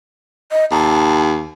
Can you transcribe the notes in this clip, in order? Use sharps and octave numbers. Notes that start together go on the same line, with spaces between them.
D#5
D#2 A5